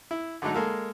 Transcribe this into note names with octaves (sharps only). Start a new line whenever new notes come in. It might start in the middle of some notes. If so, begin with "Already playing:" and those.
E4
D3 F#3 G#3 A3 D#4
G#3 A#3 A4